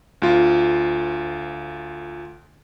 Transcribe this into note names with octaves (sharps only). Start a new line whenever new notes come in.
D2 F4